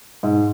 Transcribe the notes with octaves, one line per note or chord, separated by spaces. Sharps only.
G#2